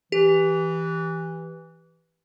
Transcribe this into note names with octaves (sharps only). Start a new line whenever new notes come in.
E3 G4